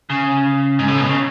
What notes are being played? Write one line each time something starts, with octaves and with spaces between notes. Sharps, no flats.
C#3
G#2
A2
B2
C#3